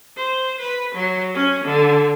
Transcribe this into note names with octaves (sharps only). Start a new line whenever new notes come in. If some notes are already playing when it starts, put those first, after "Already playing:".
C5
B4
F#3
C#4
D3